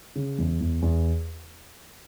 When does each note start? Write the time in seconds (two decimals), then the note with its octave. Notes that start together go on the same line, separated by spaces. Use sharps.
0.16 C#3
0.38 E2
0.61 E2
0.82 E2